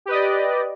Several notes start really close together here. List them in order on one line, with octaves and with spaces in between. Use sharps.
G4 B4 D#5 D5